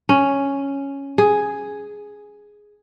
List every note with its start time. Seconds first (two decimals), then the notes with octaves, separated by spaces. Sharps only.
0.09 C#4
1.18 G#4